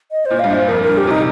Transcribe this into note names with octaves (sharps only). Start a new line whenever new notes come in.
D#5
A#2 C5
G2 F5
A#2 C5
F2 A#4
A#4
G2
G4
C3 D#4